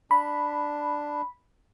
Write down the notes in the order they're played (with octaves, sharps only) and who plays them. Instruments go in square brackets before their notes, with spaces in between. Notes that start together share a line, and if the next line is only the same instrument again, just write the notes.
[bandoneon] D4 [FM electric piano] B5